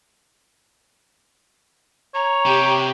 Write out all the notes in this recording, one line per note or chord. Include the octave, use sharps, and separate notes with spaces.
C#5 A#5
C3 G4 G5